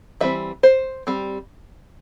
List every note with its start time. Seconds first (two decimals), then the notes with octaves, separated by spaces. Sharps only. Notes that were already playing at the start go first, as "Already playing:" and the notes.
0.21 E3 G3 C4 E5
0.63 C5
1.07 G3 C4